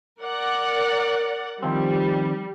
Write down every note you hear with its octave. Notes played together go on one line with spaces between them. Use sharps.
A#4 D5 F#5
D#3 F3 G3 C4